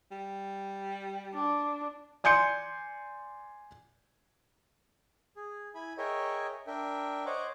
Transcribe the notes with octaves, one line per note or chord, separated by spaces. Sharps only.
G3
D4
D5 G#5 C6 G6 C#7
G#4
E4 G#5 B5
G#4 A#4 C#5 D#5 E5 G5
D4 A#4 E5 G5
C5 C#5 D#5 F#5 D6